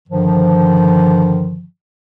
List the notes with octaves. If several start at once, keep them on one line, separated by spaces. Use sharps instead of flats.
G2 D3 D#3 F3